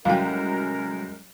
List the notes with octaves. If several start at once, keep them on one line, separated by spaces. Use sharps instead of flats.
C2 A2 F#3 G#3 C#4 A#4 F5 G5